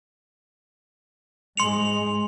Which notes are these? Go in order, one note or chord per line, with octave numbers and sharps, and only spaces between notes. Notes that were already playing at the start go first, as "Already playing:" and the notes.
G#2 G#3 C6 C#7 F7